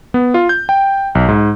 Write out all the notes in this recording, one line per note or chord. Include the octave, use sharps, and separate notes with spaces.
B3
F4
G6
G5
B1
G#2